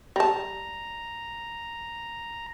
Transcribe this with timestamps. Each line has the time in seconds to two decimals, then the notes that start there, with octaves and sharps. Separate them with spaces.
0.16 G3 A5 A#5